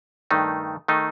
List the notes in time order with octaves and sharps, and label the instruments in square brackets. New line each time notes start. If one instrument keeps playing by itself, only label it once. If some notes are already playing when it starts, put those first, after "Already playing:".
[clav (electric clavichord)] G2 D#3 A3 D#4
D#3 A3 D#4